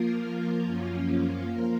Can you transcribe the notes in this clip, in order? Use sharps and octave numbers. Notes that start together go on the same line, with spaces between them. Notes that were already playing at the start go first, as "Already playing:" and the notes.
Already playing: F3 A#3 F4 A#4
F#2 F3 A#3 C#4 F4
F3 A#3 F4 A#4